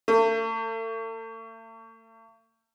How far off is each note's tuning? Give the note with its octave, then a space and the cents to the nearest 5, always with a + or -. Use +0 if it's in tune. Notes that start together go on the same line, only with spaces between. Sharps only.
A3 +40